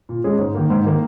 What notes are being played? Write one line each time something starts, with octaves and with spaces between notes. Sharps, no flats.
A#2
G#3 C#4 G#4
G#2
D#3 A#3
G#2
D#3 A#3